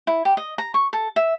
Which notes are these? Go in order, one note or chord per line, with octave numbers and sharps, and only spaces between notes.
E4
G4
D#5
A#5
C#6
A4
E5